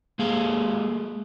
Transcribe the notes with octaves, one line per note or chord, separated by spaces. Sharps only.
G#3 A#3 G#4 F5